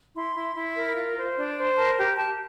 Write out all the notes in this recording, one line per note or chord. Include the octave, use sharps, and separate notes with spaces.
E4 C6
E4
E4
A#4
F4
C5
D4
C5
A#4 A5
G4
G4 A5